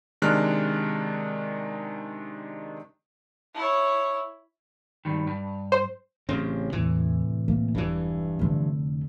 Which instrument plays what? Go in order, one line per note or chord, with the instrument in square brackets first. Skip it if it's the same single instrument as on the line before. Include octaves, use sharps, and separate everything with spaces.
[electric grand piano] C3 D#3 G#3 D4 F6 F#6
[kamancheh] E4 C#5
[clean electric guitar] G2 D#3
G2
[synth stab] C5
[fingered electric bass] A1 C#3 C4
[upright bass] E2 [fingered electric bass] A2 C3 E3
[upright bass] A#3
[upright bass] E1 [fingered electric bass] G2 E3
[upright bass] F1 D3